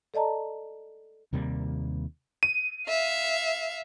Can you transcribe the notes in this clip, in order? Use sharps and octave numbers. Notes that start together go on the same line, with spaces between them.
A4 D5 D#5 A5 A#5
D#2 C3 G3 A#3
D#7
E5 F5